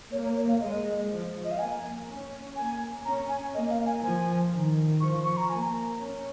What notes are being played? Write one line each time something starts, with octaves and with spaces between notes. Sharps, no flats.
A#3 C#5
C#5
C#5
F5
G#3 D#5
F3
D#5
F5
A#3 G#5
C#4
A#3 G#5
C#4 A#5
G#5
A#3 D#5
F5
G#5
F3 G#5
D#3
F3 C#6
C#6
A#5
A#3 G#5
A#5
C#4